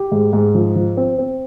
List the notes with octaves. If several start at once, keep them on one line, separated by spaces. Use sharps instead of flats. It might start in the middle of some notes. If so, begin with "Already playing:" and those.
Already playing: G4
G#2
G#2
F3
F3
C4
C4